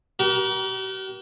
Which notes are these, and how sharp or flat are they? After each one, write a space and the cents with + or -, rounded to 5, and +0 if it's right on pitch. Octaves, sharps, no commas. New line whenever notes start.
G4 -45 A#4 +35